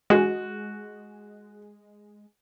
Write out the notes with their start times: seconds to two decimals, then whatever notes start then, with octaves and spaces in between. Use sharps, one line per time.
0.10 G#3 F#4